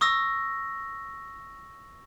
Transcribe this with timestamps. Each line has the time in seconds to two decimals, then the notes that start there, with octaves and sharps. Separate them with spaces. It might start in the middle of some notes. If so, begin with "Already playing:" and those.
0.01 C#6 D#6 E6 A#6